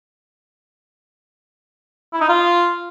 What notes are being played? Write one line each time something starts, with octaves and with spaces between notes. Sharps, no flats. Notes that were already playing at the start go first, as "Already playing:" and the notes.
E4
D#4
F4